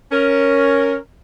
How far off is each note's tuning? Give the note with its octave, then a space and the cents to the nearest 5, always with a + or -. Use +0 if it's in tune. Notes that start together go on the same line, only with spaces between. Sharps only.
C#4 +0 A#4 +0